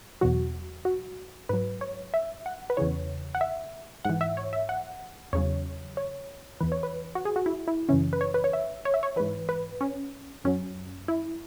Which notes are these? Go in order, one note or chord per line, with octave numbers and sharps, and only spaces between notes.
E2 B2 F#3 F#4
F#4
G#2 F#3 B4
C#5
E5
F#5
B4
E2 C#3 E3 C#5
F#5
E5
G#2 E3 F#5
E5
C#5
E5
F#5
E2 C#3 F#3 C#5
C#5
E2 E3 B4
C#5
B4
F#4
G#4
F#4
E4
E4
F#2 C#3 E3 C#4
B4
C#5
B4
C#5
E5
C#5
E5
C#5
G#2 E3 B4
B4
C#4
F#2 F#3 C#4
E4